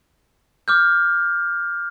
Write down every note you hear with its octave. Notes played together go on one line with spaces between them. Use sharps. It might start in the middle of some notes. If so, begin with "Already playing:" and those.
D6 F6 G6